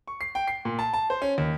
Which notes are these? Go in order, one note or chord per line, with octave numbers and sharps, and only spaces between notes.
C#6
C7
G5
C7
A#2
A5
A5
C5
C#4
D#2